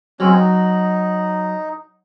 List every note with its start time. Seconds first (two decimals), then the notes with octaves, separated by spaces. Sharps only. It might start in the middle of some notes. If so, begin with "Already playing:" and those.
0.20 F#3 G#3 C4 C#4
0.33 D#4